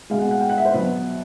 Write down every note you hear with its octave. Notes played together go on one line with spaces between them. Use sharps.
B2 G#3 F5
F#5
F#5
G5
F#5
E5
C5
B2 F#3 B4